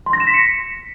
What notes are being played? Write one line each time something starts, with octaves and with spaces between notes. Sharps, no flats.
C6
A#6
E7
B6
C#7